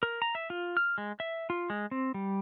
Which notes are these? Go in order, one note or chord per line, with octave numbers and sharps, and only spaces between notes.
A#4
A#5
E5
F4
F6
G#3
E5
F4
G#3
C4
G3